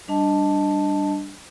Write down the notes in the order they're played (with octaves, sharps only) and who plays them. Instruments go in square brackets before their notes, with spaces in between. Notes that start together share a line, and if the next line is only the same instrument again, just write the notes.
[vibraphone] G3 D4 D#5 A5